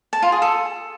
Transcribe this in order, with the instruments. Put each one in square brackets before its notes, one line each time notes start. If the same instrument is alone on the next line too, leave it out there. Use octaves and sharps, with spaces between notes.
[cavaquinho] A5
F4
G#4
A4